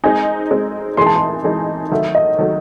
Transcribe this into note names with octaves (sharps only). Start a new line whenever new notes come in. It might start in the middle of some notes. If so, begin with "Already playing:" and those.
G#3 C4 D#4 G#5
G#3 C4 D#4
E3 G#3 D#4 G#4 C6
A5
C6
E3 G#3 D#4 G#4
D#3 F#3 A3 E5
D#5
D#3 F#3 A3